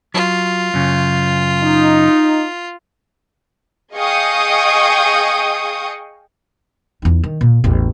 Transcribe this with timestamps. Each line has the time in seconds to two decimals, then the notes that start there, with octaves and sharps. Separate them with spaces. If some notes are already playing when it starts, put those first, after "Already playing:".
0.14 F#3 F4
0.74 F#2 C#3
1.63 D#4
3.94 G#4 D#5 F5 G5 C#6 D#6
7.02 E2 D#4
7.24 D#3
7.41 A#2
7.64 A1 E2